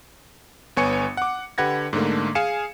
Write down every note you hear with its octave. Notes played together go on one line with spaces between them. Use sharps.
G1 B3 C#5 G#5 C#7
F#5 D6
D3 G4 B4 F#5 G#6 A#6
G#2 D3 A3 A#3
G#4 F5 G#5 C#7 E7